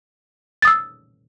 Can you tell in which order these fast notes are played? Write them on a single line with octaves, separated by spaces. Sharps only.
A6 D#6 E6